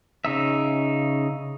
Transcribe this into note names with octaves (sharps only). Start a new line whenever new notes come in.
C#3 D#4 E5